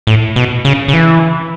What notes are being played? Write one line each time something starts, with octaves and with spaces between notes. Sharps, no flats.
A2
B2
C#3
C#3
E3